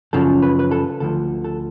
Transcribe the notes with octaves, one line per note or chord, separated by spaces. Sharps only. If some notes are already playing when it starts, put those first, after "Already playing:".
F#2 C#3 F3 A4
B4
B4
A4
D2 D3 F3 A4
A4